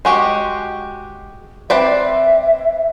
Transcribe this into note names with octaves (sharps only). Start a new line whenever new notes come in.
G#3 F#4 G4
C4 B4 D5 E5